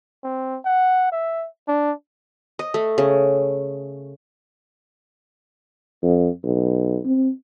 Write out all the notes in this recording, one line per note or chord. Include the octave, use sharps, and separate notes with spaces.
C4
F#5
E5
D4
D#5
A3
C#3
F2
B1
C4